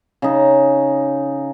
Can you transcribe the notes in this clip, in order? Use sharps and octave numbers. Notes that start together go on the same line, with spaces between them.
C#3 D#4